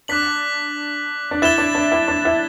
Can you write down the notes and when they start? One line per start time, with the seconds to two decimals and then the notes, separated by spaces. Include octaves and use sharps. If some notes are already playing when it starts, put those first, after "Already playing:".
0.08 D4 D6 F#6 B6 F#7
1.31 D4
1.42 E4 A6 E7 G7
1.58 D4
1.75 D4
1.92 E4
2.08 D4
2.25 E4